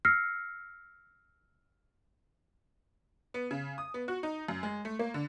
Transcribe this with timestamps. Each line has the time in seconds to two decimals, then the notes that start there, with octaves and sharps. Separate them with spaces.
0.05 E6 F6 A#6 C7 C#7
3.34 B3
3.51 C#3
3.78 D#6
3.94 B3
4.08 F#4
4.23 D#4
4.48 F#2
4.63 G#3
4.85 A3
4.99 A#3
5.14 D3